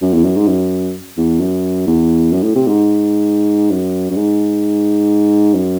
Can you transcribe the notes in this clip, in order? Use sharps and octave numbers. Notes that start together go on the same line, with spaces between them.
F#2
E2
F#2
G#2
F#2
E2
F#2
E2
F#2
A2
C3
G#2
F#2
F#2
G#2
F#2